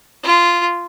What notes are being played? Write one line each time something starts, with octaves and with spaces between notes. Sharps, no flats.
F4